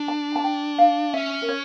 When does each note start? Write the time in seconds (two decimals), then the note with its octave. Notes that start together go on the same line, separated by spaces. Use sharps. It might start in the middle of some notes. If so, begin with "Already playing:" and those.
Already playing: D4
0.08 A5
0.36 A5
0.44 G5
0.78 F5
1.14 C#4 E5
1.42 A#4
1.49 C#5